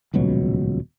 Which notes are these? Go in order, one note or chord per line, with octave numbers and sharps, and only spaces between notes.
D#1 C#2 B2 F#3